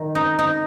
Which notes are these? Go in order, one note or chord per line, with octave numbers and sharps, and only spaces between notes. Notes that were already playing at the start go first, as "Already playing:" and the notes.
Already playing: D#3
D#4
D#4